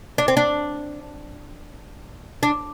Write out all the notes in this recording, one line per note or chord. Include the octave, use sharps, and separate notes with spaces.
D4
C4
D4
D4